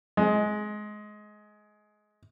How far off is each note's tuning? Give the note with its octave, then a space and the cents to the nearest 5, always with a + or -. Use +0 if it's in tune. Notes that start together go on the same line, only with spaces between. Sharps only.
G#3 +20